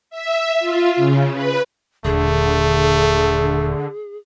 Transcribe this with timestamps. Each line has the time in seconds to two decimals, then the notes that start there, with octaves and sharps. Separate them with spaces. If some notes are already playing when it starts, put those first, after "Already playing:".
0.10 E5
0.59 F4
0.96 C#3
1.33 B4
2.05 D#1 D3 A3 G#4